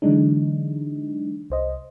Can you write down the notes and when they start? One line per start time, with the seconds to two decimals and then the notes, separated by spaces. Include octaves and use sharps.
0.02 D3 E3 F#3 G#3 D4 D#4
1.50 C2 C5 D#5